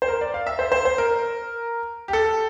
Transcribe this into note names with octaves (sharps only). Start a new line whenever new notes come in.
C5
A#4
D5
F5
E5
C5
C5
C5
A#4
G4
A4